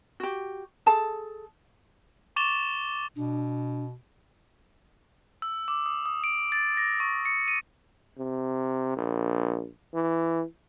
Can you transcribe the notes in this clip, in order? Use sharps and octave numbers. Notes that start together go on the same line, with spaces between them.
F#4 G4
G#4 A4 A5
C#6 D6 A6 E7 F7 G7
B2 D4
E6
D6
D#6
D#6
D7
A6
A#6
C#6
C#7
D#7
C3
A#1
E3